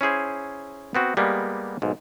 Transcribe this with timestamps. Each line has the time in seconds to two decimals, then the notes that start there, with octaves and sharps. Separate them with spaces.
0.01 C#4 E4 G#4 C5
0.95 B3 C4 F#4
1.17 G3 G#3 A#3 B3
1.82 B1 G#2